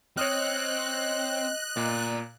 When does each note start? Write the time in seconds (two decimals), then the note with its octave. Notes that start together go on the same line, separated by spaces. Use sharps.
0.17 C4 C#5 D#5 D#6 F6 F#6
1.77 A#2 D5 A#5